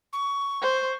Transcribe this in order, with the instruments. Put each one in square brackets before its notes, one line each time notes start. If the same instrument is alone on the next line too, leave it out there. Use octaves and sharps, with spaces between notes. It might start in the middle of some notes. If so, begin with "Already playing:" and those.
[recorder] C#6
[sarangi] C5